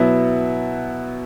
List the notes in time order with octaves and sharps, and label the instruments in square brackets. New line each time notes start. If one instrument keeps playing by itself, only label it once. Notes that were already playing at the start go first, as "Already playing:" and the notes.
Already playing: [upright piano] B2 F#3 B3 E4